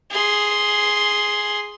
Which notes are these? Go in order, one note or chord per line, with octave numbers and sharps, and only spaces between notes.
G#4 C6